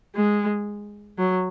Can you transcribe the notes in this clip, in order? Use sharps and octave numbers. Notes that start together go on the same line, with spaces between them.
G#3
F#3